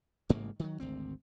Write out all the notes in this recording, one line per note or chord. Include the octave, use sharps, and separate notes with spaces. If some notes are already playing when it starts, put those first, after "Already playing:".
A1 G#2 C#3 A#3
D#3 F#3
G#1 D2 C4